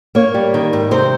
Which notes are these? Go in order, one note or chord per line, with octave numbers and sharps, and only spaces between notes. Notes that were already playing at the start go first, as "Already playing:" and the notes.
A#3 C#5
G3
D#3
G#2
C3 C5